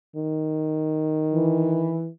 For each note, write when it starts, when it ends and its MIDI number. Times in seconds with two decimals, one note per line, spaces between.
0.16 2.01 51
1.32 2.07 52